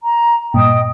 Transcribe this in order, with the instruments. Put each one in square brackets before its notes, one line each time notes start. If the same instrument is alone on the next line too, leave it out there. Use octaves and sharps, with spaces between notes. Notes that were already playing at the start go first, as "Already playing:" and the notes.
[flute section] A#5
[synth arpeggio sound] G2 A#2 [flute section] D#5 G5 D#6